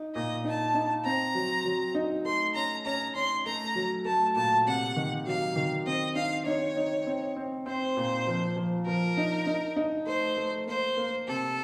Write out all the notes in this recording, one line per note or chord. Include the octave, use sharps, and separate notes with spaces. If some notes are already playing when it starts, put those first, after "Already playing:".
Already playing: D#4
A#2 D#5
D#4 A5
D#4
C4 A#5
F#3
F#3
D#4
A3 C6
C#4 A#5
C#4 A#5
C#4 C6
A3 A#5
F#3
A3 A5
A#2 A5
C3 F#5
D#3
F#3 F5
D#3
C4 D#5
D#4 F5
D#4 C#5
D#4
C4
C4
C4 C5
A#2
F3
F3
F3 A#4
D#4
D#4
D#4
A3 C5
A3
A#3 C5
A#3
C3 A4